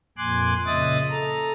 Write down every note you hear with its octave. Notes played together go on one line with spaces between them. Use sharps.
F2 A#2 G#5 C6 D6 F#6
A#2 C#3 D#5 E5 D#6 A6
A4 A#5